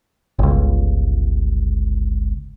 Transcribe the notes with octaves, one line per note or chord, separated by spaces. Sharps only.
G1 C#2